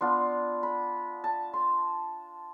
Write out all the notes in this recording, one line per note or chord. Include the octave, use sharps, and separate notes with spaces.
B3 D4 F4 C6
B5
A5
C6